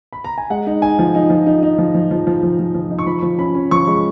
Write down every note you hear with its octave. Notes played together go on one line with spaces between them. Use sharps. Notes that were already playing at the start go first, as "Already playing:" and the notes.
B5
A#5
G#5
G#3 F#5
D#4
D#4 G#5
F3
D#4
F3
D#4
D#4
F3
F3
F3
F3
F3
F3
F3
D#4
C#6
F3 B5
F3
C#4 B5
C#4
F3 C#6
G#3